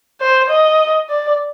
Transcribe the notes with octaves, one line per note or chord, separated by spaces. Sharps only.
C5
D#5
D5